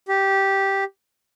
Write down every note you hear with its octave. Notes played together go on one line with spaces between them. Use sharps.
G4